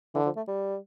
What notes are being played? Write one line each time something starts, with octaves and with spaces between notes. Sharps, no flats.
D3 E3
F3
A3
G3